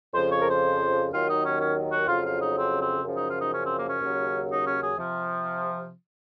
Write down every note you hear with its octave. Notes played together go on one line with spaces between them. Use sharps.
F2 C#3 F3 C5
C#5
A#4
C5
D#2 D#3 F#3 F4
D#4
C#4
C#4
F#4
F2 C#3 F#3 F4
F4
D#4
C4
C4
F#2 C#3 F3
D#4
F4
D#4
C#4
C4
A#3
C#4
D#2 C#3 F#3
D#4
C#4
G#4
C3 F3